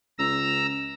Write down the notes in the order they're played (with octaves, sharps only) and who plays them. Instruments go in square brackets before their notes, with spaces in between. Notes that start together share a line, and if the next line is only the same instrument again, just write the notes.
[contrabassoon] C#2 [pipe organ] A#5 E6